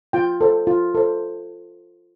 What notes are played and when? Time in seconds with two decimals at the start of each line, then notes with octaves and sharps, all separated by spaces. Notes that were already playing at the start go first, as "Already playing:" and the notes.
0.13 F4 G5
0.41 A4 C5
0.67 F4
0.95 A4 C5